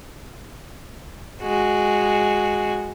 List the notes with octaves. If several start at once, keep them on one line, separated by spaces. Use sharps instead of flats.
G#3 F#4